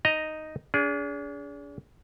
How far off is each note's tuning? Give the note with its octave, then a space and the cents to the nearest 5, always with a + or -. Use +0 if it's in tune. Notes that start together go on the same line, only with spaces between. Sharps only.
D#4 +0 D#5 +0 A#5 +0
D4 -40 G#4 +0